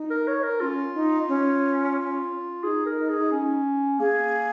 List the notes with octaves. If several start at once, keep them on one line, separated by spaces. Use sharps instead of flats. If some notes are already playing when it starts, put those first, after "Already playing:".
Already playing: D#4
A#4
C#5
A#4
C#4 F4
D#4
C#4
D#4 G#4
A#4
G#4
C#4
A#3 G#4